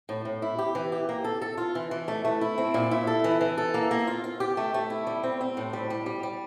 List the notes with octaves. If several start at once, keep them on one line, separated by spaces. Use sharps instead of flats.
A2
A2
E4
G4
E3
G4
A#3
A4
A4
F4
E3
E3
A3
A3
E4
C4
A#2
E4
A4
E3
E3
A4
A#3
A#3
F4
F4
G4
A3
A3
E4
G3
C4
C4
A2
G3
G3
G3
G3